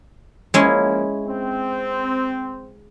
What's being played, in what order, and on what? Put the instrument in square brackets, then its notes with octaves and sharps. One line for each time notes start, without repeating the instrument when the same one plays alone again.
[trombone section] F3 A#3 [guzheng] G#3 C#4 E4
[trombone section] C4